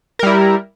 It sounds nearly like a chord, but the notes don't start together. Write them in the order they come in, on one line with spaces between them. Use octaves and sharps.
A#4 G3 E4